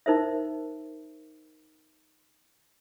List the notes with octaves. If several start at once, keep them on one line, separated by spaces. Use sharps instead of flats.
D#4 A#4 C5 E5